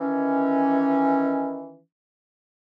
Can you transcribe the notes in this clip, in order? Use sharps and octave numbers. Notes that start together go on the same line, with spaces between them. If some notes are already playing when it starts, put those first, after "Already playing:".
D#3 E3 C#4